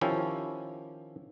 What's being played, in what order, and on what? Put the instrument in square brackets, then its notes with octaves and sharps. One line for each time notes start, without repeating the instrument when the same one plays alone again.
[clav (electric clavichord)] D#3 F3 C#4 E4 G4 C#5